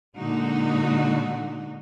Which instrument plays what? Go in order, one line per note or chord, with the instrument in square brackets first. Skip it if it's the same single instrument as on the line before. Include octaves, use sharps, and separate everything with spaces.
[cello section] A#2 D3 G#3 D#4 F#4